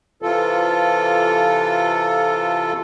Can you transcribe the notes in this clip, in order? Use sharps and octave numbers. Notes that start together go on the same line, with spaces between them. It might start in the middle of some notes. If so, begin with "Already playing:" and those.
C3 E3 F4 A4